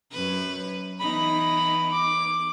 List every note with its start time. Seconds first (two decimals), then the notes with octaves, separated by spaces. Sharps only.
0.12 F#2 B4
1.00 E3 B3 D#4 B5
1.92 D6